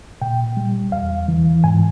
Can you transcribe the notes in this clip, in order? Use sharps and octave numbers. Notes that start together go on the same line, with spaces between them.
A#2 G5
G3
E2 F5
E3
G#2 G#5